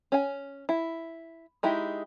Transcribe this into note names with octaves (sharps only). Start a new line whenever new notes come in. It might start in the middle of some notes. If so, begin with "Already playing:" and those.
C#4 G#5
E4
G#3 D#4 E4 G4